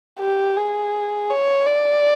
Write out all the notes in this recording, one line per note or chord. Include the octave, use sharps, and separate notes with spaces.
G4
G#4
C#5
D5